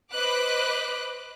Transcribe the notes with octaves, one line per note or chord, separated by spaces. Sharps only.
B4 C5 D#5 B5 D6 F#6